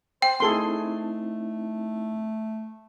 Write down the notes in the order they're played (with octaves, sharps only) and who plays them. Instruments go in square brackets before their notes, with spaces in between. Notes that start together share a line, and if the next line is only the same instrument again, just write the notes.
[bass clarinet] C5 [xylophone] G5
[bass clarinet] A3 [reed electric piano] C4 D#4 E4 [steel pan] G#4 A4 C6